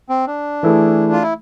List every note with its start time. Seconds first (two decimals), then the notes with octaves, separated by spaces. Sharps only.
0.09 C4
0.27 D4
0.63 E3 A3 E4 G#4
1.12 F4
1.23 E4